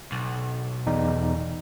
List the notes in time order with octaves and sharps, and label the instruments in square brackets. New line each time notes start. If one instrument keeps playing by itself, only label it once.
[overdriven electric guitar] B1
[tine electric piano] E2 D#4 D5